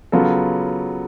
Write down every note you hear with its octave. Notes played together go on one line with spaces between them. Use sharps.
C#3 F#3 B3 F4 A4